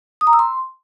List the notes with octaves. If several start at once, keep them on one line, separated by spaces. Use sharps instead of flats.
D#6
A#5
E6
C6